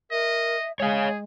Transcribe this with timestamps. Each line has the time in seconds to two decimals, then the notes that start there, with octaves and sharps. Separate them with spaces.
0.11 A#4 D#5 E5
0.80 G#3 G#4 C#5 F5 G#5